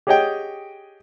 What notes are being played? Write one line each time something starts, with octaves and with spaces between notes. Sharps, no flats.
G4 G#4 C#5 D#5 F#5 G5